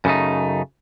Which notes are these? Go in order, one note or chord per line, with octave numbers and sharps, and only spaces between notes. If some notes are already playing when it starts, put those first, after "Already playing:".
F#2 C#3 A3 D#4